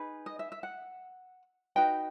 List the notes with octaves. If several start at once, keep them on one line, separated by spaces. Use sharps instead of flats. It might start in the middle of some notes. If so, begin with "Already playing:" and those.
Already playing: D#4 G#4 B4
D#5
E5
E5
F#5
D#4 F#4 B4 G5